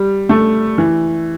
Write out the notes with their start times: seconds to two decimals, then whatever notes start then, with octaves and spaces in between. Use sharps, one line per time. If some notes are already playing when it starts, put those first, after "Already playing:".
Already playing: G3
0.29 A3
0.78 E3